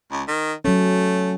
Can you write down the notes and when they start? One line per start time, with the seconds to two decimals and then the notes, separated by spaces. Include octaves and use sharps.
0.11 C#2
0.28 D#3
0.65 F#3 A3 C#4